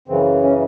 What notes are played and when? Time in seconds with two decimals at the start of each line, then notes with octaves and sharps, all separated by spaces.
0.08 F#2 C#3 E3 C4
0.43 C#4